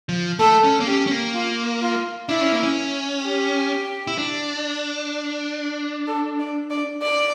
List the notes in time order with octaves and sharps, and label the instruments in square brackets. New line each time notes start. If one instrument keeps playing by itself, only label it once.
[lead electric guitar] F3
[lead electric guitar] A3 [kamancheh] A4
[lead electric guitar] C#4
A#3
[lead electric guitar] C#4 [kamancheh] G4
[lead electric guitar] C#4
A#3
[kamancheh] F4
F4
[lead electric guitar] D4 [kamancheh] E4
[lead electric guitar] C#4
A#3
C#4
[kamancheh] G4
[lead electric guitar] E4
D4
[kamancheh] A4
D5
D5
D5